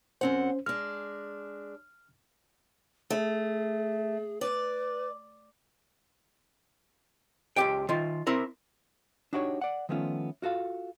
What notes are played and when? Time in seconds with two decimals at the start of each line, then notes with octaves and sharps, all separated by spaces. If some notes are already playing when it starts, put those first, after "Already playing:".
0.21 F#2 C4 C#4 C5 F#5
0.66 G#3 D4 F6
3.10 A3 G#4
4.41 B4 D5
7.56 C#2 G4 G5
7.89 D#3 F4
8.27 C4 E4 A#4
9.33 D4 D#4 F#4 G4 B4 C#5
9.61 D5 F#5
9.89 D#3 F3 A3 B3 C#4 F4
10.42 F4 F#4 A4 F5